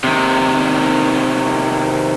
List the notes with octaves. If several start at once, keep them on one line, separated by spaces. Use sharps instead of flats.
C3 D#3